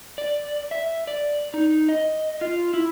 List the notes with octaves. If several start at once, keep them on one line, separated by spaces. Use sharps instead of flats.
D5
E5
D5
D#4
D#5
F4
E4